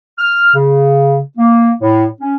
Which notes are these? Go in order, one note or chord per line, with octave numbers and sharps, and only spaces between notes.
F6
C#3
A#3
A2
C#4